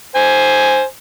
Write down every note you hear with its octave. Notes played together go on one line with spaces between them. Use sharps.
C5 G#5